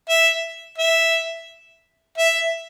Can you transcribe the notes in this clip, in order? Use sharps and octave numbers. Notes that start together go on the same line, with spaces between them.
E5
E5
E5